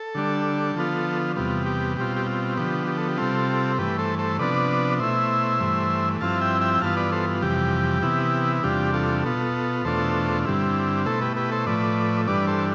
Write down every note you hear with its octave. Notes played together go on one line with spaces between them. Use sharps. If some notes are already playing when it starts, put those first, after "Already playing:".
Already playing: A4
D3 G3 D4
D3 F3 B3 F4
E2 C3 G3 B3 F4
G4
B2 G3 C4 F4 G4
G4
F4
D3 F3 B3 G4
G4
A4
G4
C3 G3 C4 F4 A4
G2 E3 A3 G4 B4
A4 C5
A4 C5
C3 F3 B3 D4 B4 D5
B2 A3 E4 C5 E5
G2 E3 A3
G2 F3 C4 E4 F5 A5
E5 G5
E5 G5
G5
G2 E3 B3 F4 F5 A5
B4 D5
A4 C5
F2 C3 E3 G3 G4
C3 E3 B3 E4
E2 C3 G3 D4 F4 G4
F4 A4
B2 B3 F4
E2 B2 A3 D4 F4 A4 C5
G2 D3 G3 C4 E4
B2 A3 E4 A4 C5
G4 B4
G4 B4
A4 C5
A2 F3 A3 B4 D5
G2 E3 G3 D4 B4 D5
A4 C5